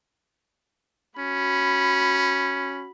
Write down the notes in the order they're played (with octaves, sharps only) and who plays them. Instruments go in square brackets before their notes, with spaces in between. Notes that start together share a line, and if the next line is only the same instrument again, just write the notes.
[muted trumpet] C#4 [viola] F#4 B5